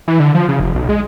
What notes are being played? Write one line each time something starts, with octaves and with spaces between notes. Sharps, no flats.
E3
D3
F3
C#3
F1
B1
G#3